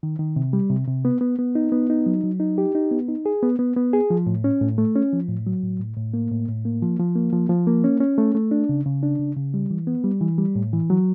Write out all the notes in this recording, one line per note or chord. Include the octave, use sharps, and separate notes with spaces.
D#3
D#3
C3
G3
C3
C3
B3
B3
B3
D#4
B3
D#4
F#3
F#3
D#4
G4
D#4
B3
D#4
G#4
B3
B3
B3
G#4
F3
A2
C#4
A2
A3
C#4
F3
A2
F#3
A2
A2
A2
A#3
A2
A2
A#3
F3
F3
A#3
F3
F3
A#3
C#4
C#4
A3
A3
D4
C#3
C#3
D4
C#3
C#3
G3
E3
B3
G3
E3
G3
A2
E3
F#3